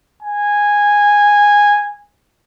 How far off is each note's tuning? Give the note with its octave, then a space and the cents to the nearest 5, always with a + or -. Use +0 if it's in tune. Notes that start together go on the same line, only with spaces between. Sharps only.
G#5 -10